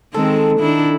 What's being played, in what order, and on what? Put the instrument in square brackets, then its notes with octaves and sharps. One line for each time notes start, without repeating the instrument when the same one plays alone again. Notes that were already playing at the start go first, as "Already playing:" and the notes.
[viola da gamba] D#3 G#3 C4 [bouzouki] A4
[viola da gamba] D#3 D4 E4